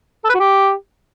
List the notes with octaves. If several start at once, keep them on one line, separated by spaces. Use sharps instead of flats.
A4
B4
F#4
G4